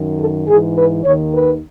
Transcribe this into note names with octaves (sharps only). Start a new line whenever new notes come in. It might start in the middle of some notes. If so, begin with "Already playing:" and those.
Already playing: F#2 D#3
A4
G#2 E3 G#4
B4
D#2 D#3 C#5
B4